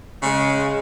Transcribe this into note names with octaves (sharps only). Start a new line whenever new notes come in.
C#3 G#3